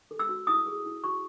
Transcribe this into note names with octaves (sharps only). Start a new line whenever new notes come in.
A4
E6
F#4
E4 D#6
G#4
E4
F#4 C#6